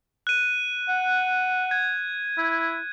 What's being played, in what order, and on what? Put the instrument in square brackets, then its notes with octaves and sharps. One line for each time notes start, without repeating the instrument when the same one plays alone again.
[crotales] F#6 D#7
[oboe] F#5
[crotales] G#6
[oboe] E4